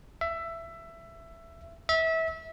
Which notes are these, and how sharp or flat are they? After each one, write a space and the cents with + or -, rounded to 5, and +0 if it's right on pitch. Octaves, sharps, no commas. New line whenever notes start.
E5 +15
E5 -25